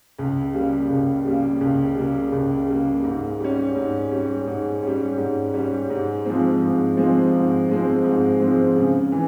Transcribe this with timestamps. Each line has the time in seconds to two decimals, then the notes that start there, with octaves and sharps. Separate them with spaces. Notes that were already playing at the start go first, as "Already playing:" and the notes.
0.19 C#2
0.53 C#3 G3 A#3
0.89 C#2
1.25 C#3 G3 A#3
1.61 C#2
1.96 C#3 G3 A#3
2.32 C#2
2.68 C#3 G3 A#3
3.04 G#2
3.40 G3 C#4
3.75 G#2
4.12 G3 C#4
4.47 G#2
4.83 G3 C#4
5.18 G#2
5.54 G3 C#4
5.90 G#2
6.25 F3 G#3 C4
6.62 G#2
6.97 F3 G#3 C4
7.33 G#2
7.69 F3 G#3 C4
8.04 G#2
8.40 F3 G#3 C4
8.76 C#3
9.12 E3